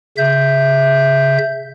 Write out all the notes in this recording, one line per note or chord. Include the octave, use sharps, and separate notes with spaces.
C#3 E5 G6